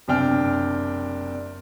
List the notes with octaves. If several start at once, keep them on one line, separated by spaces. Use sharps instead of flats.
F#1 C3 D4 G5 F6